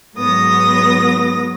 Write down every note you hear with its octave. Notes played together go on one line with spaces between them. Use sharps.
G#2 F#3 B3 D#6 A#6